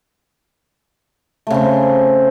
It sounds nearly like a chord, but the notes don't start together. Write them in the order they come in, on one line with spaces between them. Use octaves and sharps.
A3 C#3 C4